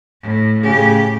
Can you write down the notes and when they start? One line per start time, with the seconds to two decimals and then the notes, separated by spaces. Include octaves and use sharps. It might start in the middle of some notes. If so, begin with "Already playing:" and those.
0.22 A2
0.63 A2 C#3 G4 G#4